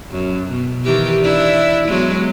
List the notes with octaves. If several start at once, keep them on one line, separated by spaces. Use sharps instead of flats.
F#2
B2
D#3 E3 G4
D4 E4
F#3 G#3 B3